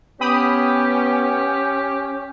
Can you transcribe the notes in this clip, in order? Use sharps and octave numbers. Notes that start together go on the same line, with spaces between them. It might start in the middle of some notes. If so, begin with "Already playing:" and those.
B3 C#4 G4 G5 B5 D#6